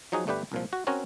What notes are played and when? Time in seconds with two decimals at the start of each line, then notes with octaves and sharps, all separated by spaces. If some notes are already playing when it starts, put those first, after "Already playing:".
0.12 F3 F#3 D#4 F#4 G#4
0.27 G1 A3 D4 G4 B4
0.52 C2 A#2 F3
0.73 F#4
0.87 C4 C#4 F#4 A#4 C#5